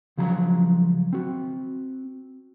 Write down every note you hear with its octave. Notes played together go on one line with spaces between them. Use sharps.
C#2 F3 F#3 A#5
C4 F#4